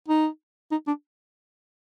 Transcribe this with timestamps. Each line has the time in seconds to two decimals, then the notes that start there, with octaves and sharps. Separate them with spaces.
0.08 D#4
0.72 D#4
0.88 D4